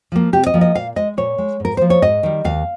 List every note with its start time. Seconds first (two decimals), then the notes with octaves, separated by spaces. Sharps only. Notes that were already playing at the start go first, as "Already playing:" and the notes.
0.12 F3 A#3
0.33 C3 G4
0.46 D#5
0.54 F3 A#3
0.61 D#5
0.75 A#2 F5
0.96 G#3 D#5
1.17 A#2 C#5
1.38 G#3
1.60 G#2 A#4
1.77 F3 A#3 C5
1.90 C#5
2.02 G#2 D#5
2.23 D#3 G3
2.45 D#2 F5